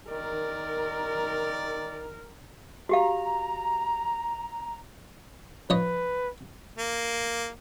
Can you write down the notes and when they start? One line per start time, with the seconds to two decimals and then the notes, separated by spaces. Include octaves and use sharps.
0.10 D#3 A#4 D5
2.89 F#4 G4 F5 A#5
5.70 F3 B4 C#5 D#5
6.78 A#3